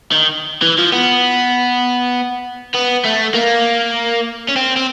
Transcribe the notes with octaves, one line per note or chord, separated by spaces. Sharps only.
D#3
E3
F3
B3
B3
A3
A#3
C#4
C4
C4